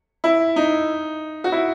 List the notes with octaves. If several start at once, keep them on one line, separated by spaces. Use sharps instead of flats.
E4
D#4
F#4
E4